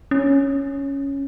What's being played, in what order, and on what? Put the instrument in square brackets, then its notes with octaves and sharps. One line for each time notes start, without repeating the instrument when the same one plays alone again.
[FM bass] C#4